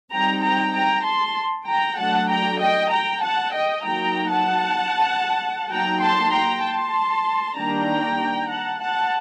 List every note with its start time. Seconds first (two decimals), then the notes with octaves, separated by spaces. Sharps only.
0.11 G3 C4 D#4 G5 A#5
0.42 G5 A#5
0.74 G5 A#5
1.05 A5 C6
1.66 G5 A#5
1.98 F#3 A3 D4 F#5 A5
2.29 G5 A#5
2.59 D#5 G5
2.90 G5 A#5
3.21 F#5 A5
3.53 D#5 G5
3.84 F#3 A#3 D#4 G5 A#5
4.30 F#5 A5
5.70 F#3 A#3 D#4 G5 A#5
6.01 A5 C6
6.32 G5 A#5
6.63 A5 C6
7.56 D#3 G3 A#3 D4 G5 A#5
8.49 F#5 A5
8.80 F#5 A5